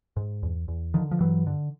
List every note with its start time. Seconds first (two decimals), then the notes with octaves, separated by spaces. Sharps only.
0.17 G#2
0.43 E2
0.68 E2
0.94 D3 D#3 F3
1.11 F3
1.20 G2 E3 F#3
1.47 D3